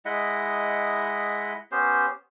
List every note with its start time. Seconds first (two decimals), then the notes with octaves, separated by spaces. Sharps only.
0.05 G#3 E4 D#5 F#5
1.72 B3 C#4 G4 C5